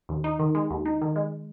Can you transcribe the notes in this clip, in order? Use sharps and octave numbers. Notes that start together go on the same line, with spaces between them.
D#2
D#4
D#3
G#3
D#2
D#4
D#3
G#3